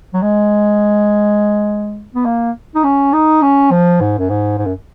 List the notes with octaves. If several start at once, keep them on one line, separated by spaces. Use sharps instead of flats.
F#3
G#3
B3
A#3
D#4
C#4
D#4
C#4
F3
G#2
F#2
G#2
G#2
F#2